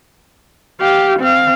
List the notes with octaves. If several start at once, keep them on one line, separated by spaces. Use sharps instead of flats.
G4 F5
C4 F5